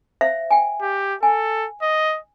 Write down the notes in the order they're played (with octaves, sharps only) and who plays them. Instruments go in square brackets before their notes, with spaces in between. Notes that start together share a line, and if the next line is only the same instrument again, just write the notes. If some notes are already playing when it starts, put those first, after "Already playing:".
[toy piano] C5 E5 F5
G5 G#5
[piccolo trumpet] G4
[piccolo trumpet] A4 [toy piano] G#5
[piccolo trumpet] D#5